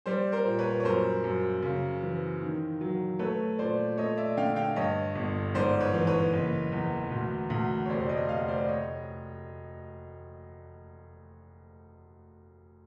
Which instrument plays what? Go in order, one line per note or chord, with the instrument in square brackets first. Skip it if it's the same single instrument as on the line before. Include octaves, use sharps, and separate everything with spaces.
[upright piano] G3 C5 D5
A#4 C5
A#2
B4 C#5
C#5
F#2 A#4 C5
F#2
C#3
E3
D#3
F#3
A3 B4 C#5
A#2 C5 D5
A3 C#5 D#5
D5 E5
D3 F5 G5
F5 G5
G2 C#5 D#5
G1
G#2 C5 D5
B4 C#5
E3
B4 C#5
F#1
E2
D2
D2
C#5
F1 C5 D5
D5
C#5 D#5
F1 D#5 F5
C5 D5
C#5 D#5